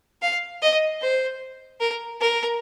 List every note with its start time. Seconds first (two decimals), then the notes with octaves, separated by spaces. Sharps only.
0.22 F5
0.62 D#5
1.01 C5
1.80 A#4
2.20 A#4